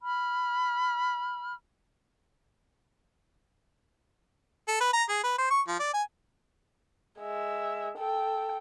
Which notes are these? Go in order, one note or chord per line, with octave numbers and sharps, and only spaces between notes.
B5 F6
A4
B4
A#5
G#4
B4
C5
C#6
F3
D5
G#5
G#3 E5
A4 G5